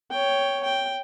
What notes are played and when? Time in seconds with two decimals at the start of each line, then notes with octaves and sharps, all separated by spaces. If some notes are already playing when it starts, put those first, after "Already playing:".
0.11 C#5 G5
0.63 G5